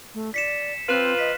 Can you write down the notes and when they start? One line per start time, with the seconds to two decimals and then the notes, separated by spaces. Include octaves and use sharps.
0.14 A3
0.34 D5 B6 C#7 E7
0.89 F3 C4 F4 B4 F#6 E7
1.19 D#5 B6